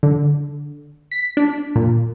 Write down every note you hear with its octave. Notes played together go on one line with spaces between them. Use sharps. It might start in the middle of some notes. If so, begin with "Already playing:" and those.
D3
B6
D4
A#2